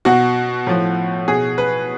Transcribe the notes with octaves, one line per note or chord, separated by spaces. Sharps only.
B2 F#4
A2 F3
B2 G#4
B4